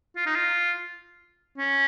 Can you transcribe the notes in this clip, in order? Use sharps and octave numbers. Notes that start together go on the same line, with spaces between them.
F4
D#4
F4
C#4